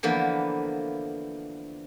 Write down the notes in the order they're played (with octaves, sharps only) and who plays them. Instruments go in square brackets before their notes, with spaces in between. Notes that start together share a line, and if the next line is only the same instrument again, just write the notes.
[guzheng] D3 E3 F3 A#3 B3 E4